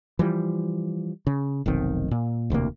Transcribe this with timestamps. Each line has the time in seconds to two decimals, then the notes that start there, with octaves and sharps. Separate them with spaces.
0.19 E3 F3 G3
1.27 C#3
1.66 F1 B1 D#3 C4
2.11 A#2
2.50 E1 D2 C3 A#3